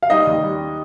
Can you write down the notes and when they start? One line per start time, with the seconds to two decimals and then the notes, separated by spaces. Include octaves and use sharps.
0.03 F5
0.10 G3 D#4 D#5
0.27 D#2
0.44 G3